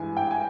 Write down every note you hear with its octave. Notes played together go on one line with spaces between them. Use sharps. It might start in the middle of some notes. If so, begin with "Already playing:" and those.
Already playing: G2 E3 G#3 G#5
G5
G#5